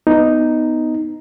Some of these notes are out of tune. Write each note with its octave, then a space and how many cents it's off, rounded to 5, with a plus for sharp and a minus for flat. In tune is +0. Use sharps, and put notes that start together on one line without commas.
B3 +10 D#4 +0